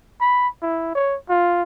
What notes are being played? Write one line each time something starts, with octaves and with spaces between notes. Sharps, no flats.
B5
E4
C#5
F4